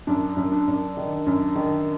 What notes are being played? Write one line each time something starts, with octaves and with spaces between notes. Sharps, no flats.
F#2 D4
F#2
D4
F#2
D#3
F#2
D#3